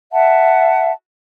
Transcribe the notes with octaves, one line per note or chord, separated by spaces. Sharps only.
E5 F#5 A5